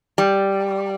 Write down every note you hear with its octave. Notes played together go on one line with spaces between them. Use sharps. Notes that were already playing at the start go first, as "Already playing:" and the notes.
G3